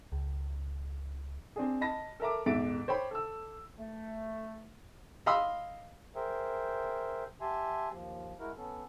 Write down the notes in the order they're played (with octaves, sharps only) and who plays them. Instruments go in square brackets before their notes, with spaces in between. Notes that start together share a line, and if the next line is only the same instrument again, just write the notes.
[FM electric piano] C#2
[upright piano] C4 D4 G#4
D#5 A5 B5 A#6
A4 A#4 E5 A#5 D6
D#1 G#2 B2 E5 A6 D7
C5 C#5 G5 B5
A4 E6
[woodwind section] A3
[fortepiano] D#5 F5 B5 C6 D#6 E6
[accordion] G#4 A#4 C5 E5 G5
G4 E5 G#5 A5 C6
D#2 F3
G#3 E4 F#4 A#4
B3 C#4 A4